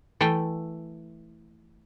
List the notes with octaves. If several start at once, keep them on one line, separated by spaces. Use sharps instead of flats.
E3 A3 G5